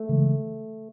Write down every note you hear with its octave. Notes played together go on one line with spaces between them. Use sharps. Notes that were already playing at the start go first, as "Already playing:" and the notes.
Already playing: A3
C#3 E3 G#3